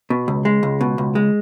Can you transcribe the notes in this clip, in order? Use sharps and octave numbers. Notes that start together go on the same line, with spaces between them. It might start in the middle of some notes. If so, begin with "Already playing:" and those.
B2
C#2
G#3
C#2
B2
C#2
G#3